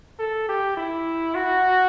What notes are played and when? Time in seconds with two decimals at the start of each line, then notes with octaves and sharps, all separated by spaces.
0.19 A4
0.49 G4
0.77 E4
1.35 F#4